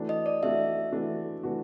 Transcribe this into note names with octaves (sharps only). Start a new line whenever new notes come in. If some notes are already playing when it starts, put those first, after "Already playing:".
Already playing: E3 A3 D4 F#4
D#5
D5
E3 A3 D4 F#4 E5
E3 A3 D4 F#4
E3 A3 D4 F#4